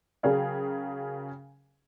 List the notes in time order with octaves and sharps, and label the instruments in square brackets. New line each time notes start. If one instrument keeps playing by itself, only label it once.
[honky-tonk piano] C#3 F#3 G#4 A#4 F5 G5